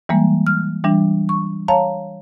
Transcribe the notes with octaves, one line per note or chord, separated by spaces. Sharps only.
E3 G3 G#3 A#3
F6
E3 G3 D4
C#6
C#5 F5 A5 A#5